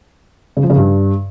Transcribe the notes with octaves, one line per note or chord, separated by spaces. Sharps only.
C#3
F3
C#3
G2